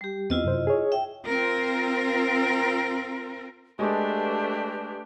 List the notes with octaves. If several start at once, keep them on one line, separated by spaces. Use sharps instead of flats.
G3 G4
E2 B3 C4 E4 F4 D#5
F#2 C3 C5
G#4 C#5
E5 G5
C4 F4 A#4
G#3 A3 D4 G4 B4